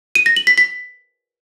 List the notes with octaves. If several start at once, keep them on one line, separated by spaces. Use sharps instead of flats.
D#7
A#6
F#7
B6
B6